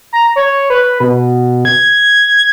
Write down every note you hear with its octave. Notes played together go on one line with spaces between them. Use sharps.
A#5
C#5
B4
B2
G#6